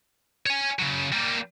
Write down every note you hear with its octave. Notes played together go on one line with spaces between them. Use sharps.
C#5 G#5
C#3 F#3
G3 A#3